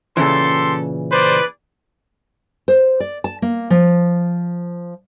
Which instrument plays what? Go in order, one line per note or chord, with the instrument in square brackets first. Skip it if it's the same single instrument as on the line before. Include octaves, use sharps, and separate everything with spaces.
[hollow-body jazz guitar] A#2 C#3 E3 [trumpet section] G4 A4 [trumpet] C6
[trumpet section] G#4 D5 [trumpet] B4 [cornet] C5
[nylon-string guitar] C5
D5
A5
A#3
F3